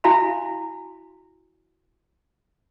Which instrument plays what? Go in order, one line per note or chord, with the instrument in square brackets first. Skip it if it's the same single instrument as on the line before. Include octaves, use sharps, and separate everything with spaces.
[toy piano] E4 F#4 F5 G#5 B5 C6